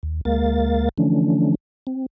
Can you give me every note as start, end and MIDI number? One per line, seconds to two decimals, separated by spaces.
0.03 0.21 39
0.25 0.89 38
0.25 0.89 56
0.25 0.89 58
0.25 0.89 70
0.25 0.89 77
0.25 0.89 93
0.98 1.55 50
0.98 1.55 52
0.98 1.55 53
0.98 1.55 57
0.98 1.55 61
0.98 1.55 62
1.87 2.06 60